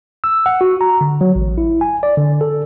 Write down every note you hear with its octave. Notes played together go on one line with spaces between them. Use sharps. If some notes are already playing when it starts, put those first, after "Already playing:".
E6
F#5
F#4
A#5
D3
F#3
A1
E4
G#5
D5
D3
A4